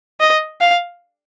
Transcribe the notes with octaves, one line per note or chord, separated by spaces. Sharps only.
D#5
F5